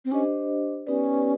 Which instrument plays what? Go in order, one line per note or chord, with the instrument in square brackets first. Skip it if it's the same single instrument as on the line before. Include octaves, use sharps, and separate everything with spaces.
[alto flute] C4
[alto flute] C#4 [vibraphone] D4 G4 C5 D#5
[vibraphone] B3 D#4 G4 B4 D5 [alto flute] C#4